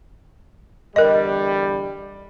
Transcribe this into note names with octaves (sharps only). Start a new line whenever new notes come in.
E2 D3 G3 A#4 D#5